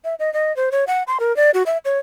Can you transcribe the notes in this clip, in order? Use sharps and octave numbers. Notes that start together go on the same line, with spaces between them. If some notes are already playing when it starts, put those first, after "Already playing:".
E5
D#5
D#5
C5
C#5
F#5
C6
A#4
D5
F#4
E5
C#5